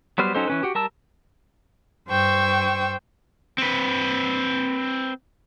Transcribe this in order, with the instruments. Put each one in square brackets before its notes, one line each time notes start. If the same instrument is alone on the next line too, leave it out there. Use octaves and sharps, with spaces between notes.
[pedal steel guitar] F#3 G3 B3 C5 F6
F#3 C#4 D#4 A4 C5
E3 C#4 B4
F#4 G4
G3 A#4 A5 E6
[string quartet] G2 C5 G5 C#6 E6
[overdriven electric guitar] C4 B4